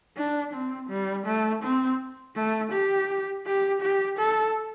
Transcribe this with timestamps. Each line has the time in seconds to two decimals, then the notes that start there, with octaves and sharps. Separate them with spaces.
0.17 D4
0.54 C4
0.90 G3
1.26 A3
1.63 C4
2.35 A3
2.72 G4
3.46 G4
3.82 G4
4.19 A4